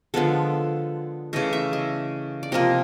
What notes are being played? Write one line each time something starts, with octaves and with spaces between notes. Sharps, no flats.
D3 F3 G#3 B3 A4
C#3 E3 A3 D#5
E5
D#5
D5
C3 F3 A#3 D#5